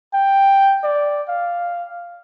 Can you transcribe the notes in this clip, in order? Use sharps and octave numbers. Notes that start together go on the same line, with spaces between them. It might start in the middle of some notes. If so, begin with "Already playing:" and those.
G5
D5
F5